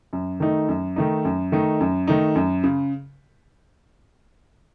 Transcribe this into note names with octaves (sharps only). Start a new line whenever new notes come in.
F#2
D#3 A3 D#4
F#2
D#3 A3 D#4
F#2
D#3 A3 D#4
F#2
D#3 A3 D#4
F#2
C#3